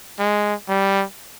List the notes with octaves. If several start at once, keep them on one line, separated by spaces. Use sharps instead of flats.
G#3
G3